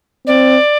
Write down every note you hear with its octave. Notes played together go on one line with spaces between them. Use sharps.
C4 D5